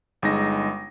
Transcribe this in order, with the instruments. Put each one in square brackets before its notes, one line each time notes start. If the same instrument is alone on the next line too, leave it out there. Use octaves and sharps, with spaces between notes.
[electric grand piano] G1 G#3 D#4 A#6